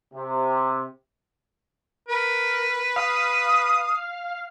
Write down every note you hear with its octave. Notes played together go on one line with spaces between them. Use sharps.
C3
A#4 B4
F5 D#6